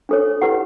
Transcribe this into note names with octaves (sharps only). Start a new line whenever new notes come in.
D4 A4 C#5
E4 G4 B4 F#5